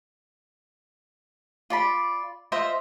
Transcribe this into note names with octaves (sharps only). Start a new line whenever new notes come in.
F4 D5 B5
F4 C5 D#5 E5